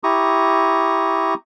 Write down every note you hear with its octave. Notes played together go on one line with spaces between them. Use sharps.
E4 G4 A#5 C#6 D#6